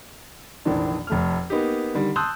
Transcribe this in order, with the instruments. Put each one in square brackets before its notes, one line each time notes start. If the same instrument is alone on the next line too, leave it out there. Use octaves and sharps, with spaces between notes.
[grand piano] F1 A#1 D#3 E3 D4
F1 A3 F6
A#3 B3 D#4 G4
D3 D#3 G3
A5 C6 D#6 E6 F#6 G6